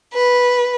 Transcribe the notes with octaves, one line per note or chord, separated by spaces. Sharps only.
B4